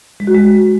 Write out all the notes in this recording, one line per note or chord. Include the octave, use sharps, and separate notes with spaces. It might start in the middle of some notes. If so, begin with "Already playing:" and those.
G#3
F#4
G#3